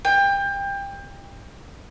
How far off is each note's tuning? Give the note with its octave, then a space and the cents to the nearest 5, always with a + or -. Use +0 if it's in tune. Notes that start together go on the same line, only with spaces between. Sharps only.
G5 +25